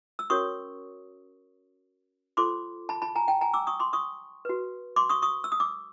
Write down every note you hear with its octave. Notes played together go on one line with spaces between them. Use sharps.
E6
C#4 F#4 A#4 C#5 C#6 D#6
F4 A4 C5 C6 D6
A5 B5
A5 B5
G#5 A#5
G5 A5
G#5 A#5
D6 E6
C#6 D#6
C6 D6
C#6 D#6
F#4 B4
C6 D6
C#6 D#6
C#6 D#6
E6
D#6
D6 E6